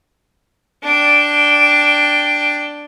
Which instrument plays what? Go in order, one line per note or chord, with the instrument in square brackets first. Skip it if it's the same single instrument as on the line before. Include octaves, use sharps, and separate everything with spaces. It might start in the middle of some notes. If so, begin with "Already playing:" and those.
[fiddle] D4 G5